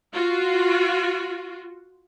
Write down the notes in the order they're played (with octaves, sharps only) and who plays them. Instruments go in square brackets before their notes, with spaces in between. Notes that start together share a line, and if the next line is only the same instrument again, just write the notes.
[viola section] F4 F#4